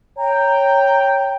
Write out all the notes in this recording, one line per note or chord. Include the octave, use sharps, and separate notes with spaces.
C#5 G5 A#5